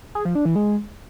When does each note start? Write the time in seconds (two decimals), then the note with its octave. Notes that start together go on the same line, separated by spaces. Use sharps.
0.15 G#4
0.25 F3
0.35 D4
0.45 E3
0.56 G#3